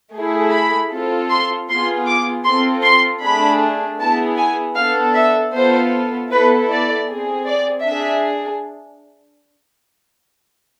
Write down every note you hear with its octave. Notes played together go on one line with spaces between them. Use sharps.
A3 E4 G#4
B5
C4 F4 A4
C6
B3 F4 G#4 C6
D6
C4 F4 A4 C6
C6
A3 D4 G#4 B5
B3 E4 G#4 A5
G#5
B3 D4 A4 F5
E5
B3 F4 A4 C5
B3 E4 A4 B4
D5
C4 G#4
D5
D4 E5
G#4